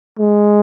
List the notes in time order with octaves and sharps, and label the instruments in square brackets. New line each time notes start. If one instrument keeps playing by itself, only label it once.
[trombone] G#3